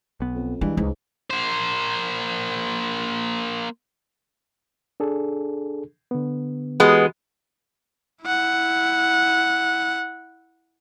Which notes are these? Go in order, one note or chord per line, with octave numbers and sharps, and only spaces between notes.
B1 B3
F2
G2 E3 G#3
C#2 G#2
A#3 C5
D4 G#4 A4
D3 B3
E3 G#3 B3 F#4 G4
E4 F#5